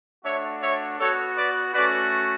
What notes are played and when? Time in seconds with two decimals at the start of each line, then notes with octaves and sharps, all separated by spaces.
0.24 A3 D4 F#4 C#5 E5
0.61 C#5 E5
0.99 B3 F#4 A4 C#5
1.36 B4 D5
1.73 A3 C#4 F#4 B4 D5